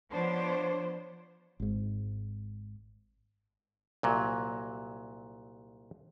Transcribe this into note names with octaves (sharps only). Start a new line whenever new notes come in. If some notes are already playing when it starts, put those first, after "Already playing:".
F3 B3 D4 C5 C#5
G#1 G#2
C2 A#2 F#3